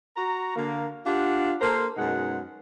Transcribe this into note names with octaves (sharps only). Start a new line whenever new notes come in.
F#4 A#5
D3 A#3
D4 F4 G4 F5 F#5
A#3 A4 A#4 C5
F#2 B2 G#3 D#4 F#5